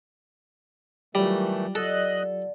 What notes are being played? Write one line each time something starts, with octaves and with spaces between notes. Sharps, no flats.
D#3 E3 F#3 G3 A3 A#3 F4 G4
D3 A4 D#5 F#6